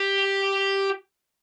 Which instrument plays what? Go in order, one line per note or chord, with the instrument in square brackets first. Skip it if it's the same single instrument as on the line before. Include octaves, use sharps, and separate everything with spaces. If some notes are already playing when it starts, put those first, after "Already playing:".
Already playing: [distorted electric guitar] G4